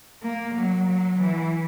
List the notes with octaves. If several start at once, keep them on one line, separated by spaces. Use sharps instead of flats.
A#3
F#3
F#3
E3